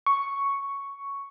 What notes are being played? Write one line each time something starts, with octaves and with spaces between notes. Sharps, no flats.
C#6